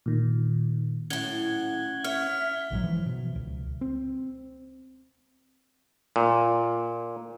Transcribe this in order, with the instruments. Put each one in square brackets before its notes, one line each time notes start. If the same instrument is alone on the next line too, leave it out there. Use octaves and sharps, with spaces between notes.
[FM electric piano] A#2 D#3
[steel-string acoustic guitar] F#2 A2 [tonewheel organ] C#4 F#5 G#6 [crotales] G7
[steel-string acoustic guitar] C#5 [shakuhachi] E5 [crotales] F6
[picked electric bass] A#1 G#2 F#3
E3 F3
B2
C#2
C4
[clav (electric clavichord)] A#2